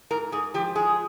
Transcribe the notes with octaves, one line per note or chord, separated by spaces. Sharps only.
G#2 A#4
G#2 G#4
F3 G4
G#3 G#4